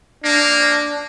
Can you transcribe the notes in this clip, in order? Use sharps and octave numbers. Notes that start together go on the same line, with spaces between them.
A#3 D4